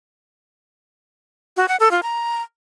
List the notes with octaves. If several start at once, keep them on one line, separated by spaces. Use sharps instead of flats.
F#4
F#5
A4
F4
A#5